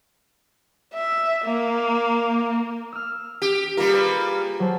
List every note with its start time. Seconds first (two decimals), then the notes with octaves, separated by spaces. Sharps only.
0.94 E5
1.45 A#3
2.93 E6 F6
3.42 G4
3.77 G3 A#3 F4 A#4
3.89 G#4 B4
4.60 F#3 C5 A5